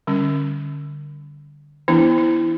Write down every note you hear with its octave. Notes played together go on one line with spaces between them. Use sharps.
D3 G3 C#4
E3 B3 D4 E4
E4